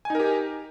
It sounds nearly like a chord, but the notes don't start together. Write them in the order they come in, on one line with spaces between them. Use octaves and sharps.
G#5 D#4 A#4 G4